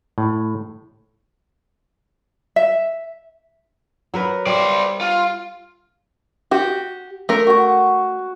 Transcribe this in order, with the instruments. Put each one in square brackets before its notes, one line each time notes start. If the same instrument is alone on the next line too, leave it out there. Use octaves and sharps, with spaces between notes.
[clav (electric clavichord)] A2
[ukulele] E5
[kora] F#3 A#4 B4
[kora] G3 [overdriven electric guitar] C5 D5
[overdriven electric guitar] F4
[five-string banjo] F#4 G4
A3 A#4
[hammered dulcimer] F#4 C#6